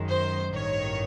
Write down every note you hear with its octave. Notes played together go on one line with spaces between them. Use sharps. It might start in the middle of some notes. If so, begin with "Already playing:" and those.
Already playing: F#2 D#3 G#3
C5
A1 G2 D#3 C#5